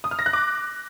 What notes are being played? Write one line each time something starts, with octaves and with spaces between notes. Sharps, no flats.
D#6
F6
A#6
F#6
D6